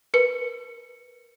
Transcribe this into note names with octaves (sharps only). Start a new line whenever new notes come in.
A#4 B4 C#7